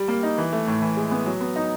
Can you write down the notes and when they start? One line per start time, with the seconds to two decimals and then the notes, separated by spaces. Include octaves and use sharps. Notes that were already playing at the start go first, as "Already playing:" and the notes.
Already playing: G3
0.08 A#3
0.23 D#4
0.38 E3
0.53 A3
0.67 A2
0.82 E3
0.97 G#3
1.11 B3
1.26 F#3
1.41 B3
1.56 D#4